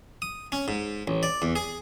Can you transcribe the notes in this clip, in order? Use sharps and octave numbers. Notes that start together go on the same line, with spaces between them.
D#6
C#4
G#2
A1
D5
E2
G#4